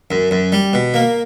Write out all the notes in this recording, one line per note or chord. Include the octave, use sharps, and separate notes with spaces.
F#2
F#2
G3
B2
A#3